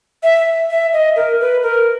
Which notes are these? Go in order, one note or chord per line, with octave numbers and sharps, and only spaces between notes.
E5
E5
D#5
A#4
B4
A#4